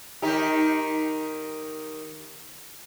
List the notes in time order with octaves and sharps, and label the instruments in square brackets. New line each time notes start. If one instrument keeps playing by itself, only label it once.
[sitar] D#3 D#4 G4